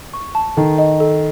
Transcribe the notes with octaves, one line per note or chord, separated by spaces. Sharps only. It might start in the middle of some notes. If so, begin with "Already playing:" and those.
C#6
A5
D#3 A4
D#5
A4